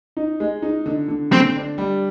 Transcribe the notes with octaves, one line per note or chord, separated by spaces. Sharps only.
D#4
G#3
D#4
D3
D3
D3 C4
D4
G3